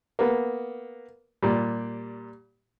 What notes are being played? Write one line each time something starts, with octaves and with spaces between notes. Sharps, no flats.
A#3 B3
A#2 G3